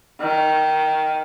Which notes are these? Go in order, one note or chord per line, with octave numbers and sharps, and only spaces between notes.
D#3